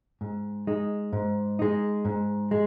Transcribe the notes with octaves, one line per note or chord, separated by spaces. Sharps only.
G#2
G#3 D#4
G#2
G#3 D#4
G#2
G#3